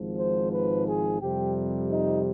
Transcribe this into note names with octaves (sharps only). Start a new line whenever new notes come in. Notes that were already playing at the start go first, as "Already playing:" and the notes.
Already playing: G#1 G#2 F3
C5
B4
G#4
F2 C3 G3 G4
D#4